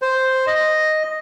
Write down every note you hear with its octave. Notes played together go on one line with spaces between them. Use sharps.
C5
D#5